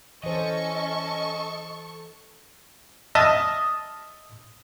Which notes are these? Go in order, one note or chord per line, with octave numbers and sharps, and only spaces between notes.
E3 C#4 A4 C5 D#5 C#6
D#5 E5 A5 D#6 F6